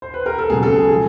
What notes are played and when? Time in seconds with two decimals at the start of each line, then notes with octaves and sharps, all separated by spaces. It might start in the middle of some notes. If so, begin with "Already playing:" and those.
0.02 C5
0.14 B4
0.26 A#4
0.38 A4
0.49 C#2 B2 F#3 G#4
0.63 A4
0.76 G#4
0.89 F3 G#3 G#4